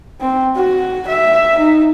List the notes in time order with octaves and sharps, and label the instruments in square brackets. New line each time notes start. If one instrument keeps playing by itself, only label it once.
[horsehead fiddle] C4
F#4
E5
D#4